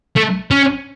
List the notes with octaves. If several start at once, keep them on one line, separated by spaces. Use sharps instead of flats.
A3
C#4